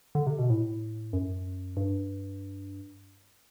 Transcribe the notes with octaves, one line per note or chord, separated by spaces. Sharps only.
D3
C3
B2
A2
F#2
G2